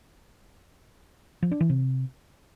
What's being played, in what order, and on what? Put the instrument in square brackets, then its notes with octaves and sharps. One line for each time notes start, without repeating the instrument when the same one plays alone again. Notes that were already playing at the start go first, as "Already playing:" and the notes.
[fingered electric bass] F3
D4
E3
C3